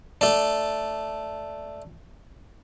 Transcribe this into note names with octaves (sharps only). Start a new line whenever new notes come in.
A3 D4